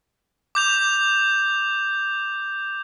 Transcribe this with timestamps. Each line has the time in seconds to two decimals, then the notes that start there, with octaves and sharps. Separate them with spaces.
0.55 D6 G6 F7